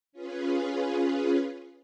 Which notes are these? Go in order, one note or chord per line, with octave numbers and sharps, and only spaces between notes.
C#4 F4 G#4 B4